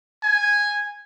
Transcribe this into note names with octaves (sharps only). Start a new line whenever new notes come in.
G#5